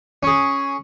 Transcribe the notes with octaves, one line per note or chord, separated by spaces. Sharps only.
C#4 G#4